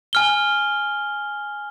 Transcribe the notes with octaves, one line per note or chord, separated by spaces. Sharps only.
G#5 F6 G7